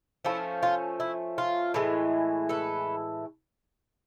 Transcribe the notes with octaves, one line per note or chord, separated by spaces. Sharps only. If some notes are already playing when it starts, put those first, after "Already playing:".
F3 A3 C#4 E4
F4
E4
F4
A2 E3 G#3
A4 B4